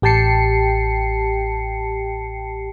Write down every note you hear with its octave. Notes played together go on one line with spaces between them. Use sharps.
A1 G4 G5 A5 C7 C#7